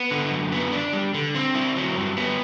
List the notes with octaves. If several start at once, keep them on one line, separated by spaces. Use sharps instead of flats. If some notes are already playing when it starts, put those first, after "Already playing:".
Already playing: B3
D3
F#2
B3
D4
G3
D3
C4
E4
F#3
G2
B3